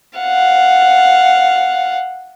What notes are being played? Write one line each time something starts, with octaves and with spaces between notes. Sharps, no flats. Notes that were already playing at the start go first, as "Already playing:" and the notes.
F5 F#5